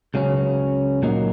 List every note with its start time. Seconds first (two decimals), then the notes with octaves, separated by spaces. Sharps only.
0.14 C#2 C#3 F#3 C#4
1.03 A#2 F#3 A#3 D#4